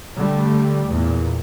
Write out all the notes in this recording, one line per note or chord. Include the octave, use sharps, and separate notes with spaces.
D3 G3 A3
E2 A#2